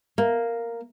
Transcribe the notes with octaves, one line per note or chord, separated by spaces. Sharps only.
A#3